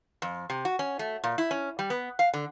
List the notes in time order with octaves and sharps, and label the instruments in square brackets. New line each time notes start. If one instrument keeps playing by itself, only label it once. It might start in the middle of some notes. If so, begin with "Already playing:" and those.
[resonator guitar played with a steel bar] F2
C3
F#4
C#4
A3
A#2
E4
C#4
G3
B3
F5
D3